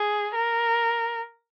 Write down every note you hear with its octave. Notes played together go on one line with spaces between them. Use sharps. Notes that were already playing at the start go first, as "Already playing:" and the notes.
Already playing: G#4
A#4